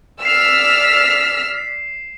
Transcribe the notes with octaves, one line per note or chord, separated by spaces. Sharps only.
D5 E6 F6 B6 C7 E7